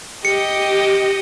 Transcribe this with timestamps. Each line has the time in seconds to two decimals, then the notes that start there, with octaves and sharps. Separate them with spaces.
0.25 G4 D#5 C#7